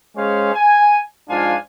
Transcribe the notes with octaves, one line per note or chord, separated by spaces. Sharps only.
G#3 C#4 G#4 C5 C#5 F5
G#5
G#2 F3 D4 F4 F5 G#5